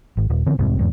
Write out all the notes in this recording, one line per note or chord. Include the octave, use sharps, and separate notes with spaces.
G#1
D#1
D3 E3 C4
F1 C2 G#2 C3
E2 G#2